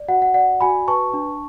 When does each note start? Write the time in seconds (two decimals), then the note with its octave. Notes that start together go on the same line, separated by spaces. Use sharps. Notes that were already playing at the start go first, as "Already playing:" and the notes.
Already playing: D5
0.08 F#4 F#5
0.22 F#5
0.34 D5 F#5
0.61 F#4 G#5 B5
0.88 B4 A5 C#6
1.14 D4